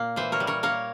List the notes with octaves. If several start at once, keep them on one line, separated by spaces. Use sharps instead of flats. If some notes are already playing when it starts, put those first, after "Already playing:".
Already playing: A#2 A#3
E3 C5 E5
A#4 C#5
G3
A#4 C#5
A#3 A#4 C#5